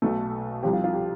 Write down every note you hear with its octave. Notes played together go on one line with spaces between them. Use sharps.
B1 B2 A3 A4
C2 C3 F3 C4 G4
F4
F4
G4